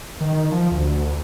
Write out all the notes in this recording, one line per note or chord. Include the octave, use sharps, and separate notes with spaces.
D#3
F3
D2